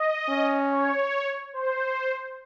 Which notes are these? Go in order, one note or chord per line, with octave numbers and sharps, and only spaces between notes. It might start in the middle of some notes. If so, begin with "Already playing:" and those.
Already playing: D#5
C#4
C#5
C5